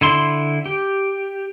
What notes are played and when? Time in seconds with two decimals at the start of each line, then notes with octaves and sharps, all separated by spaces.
0.01 D3 E4 C6
0.66 G4